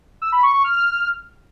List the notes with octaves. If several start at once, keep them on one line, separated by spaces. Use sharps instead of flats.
E6
B5
C#6
C#6
F6